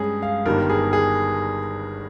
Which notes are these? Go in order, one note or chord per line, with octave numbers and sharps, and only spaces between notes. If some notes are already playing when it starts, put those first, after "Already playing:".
Already playing: G2 G#3 C#4 G#4
F5
G1 G2 D#3 G3 A#4
G#4
G#4